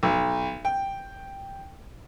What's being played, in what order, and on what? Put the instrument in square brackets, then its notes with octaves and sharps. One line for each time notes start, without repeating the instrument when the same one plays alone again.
[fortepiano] B1
G5